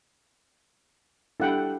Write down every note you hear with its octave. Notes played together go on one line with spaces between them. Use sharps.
G3 D4 E4 A4 F#5 G5